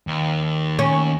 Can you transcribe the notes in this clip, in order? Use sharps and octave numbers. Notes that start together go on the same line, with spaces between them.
D#2
C#4